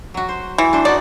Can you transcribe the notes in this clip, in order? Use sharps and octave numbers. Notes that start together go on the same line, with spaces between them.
F#3 F#4
C5
E3
D4 C5
D#4 F#4 D5 F#5